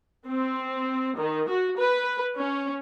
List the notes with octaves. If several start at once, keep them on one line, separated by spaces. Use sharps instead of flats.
C4
D#3
F#4
B4
C#4